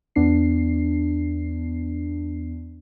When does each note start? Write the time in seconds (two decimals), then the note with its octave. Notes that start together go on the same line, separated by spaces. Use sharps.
0.16 E2 B3 D4 C7